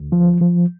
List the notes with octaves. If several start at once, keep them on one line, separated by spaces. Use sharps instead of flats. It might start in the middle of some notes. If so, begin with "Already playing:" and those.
Already playing: D2
F3
F3